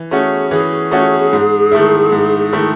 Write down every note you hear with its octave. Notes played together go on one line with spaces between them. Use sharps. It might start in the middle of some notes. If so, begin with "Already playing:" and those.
Already playing: E3
A3 C#4 F#4 G#4
E3 G#4
A3 C#4 F#4
G#2
D#3 A3 E4
G#2
D#3 A3 E4